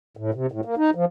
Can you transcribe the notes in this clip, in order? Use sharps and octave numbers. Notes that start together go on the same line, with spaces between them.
A2
C3
A2
A#3
D#4
F3